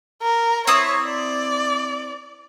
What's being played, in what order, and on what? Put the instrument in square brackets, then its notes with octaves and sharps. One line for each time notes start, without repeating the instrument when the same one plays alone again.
[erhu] A#4
[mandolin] C4 E4 D#6 [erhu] C#5
[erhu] D5